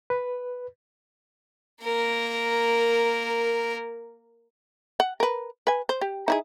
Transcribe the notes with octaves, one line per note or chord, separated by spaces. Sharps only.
B4
A#3 A#4
F#5
A#4 B4
B4 G#5
C5
G4
D#4 E4 G#4